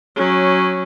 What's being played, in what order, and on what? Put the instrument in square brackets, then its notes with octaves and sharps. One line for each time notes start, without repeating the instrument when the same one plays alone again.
[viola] F#3 C#4